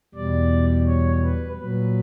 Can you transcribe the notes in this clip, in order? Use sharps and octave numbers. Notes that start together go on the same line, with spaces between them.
E2 B2 G3 D5
C#5
B4
A#2 F#3 B4